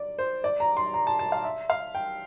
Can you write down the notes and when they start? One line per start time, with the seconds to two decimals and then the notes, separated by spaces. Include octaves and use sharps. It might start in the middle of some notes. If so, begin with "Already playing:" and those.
Already playing: D5
0.18 C5
0.44 D5
0.60 A#5
0.77 C6
0.94 A#5
1.07 A5
1.19 A5
1.32 F5
1.44 E5
1.70 F5
1.95 G5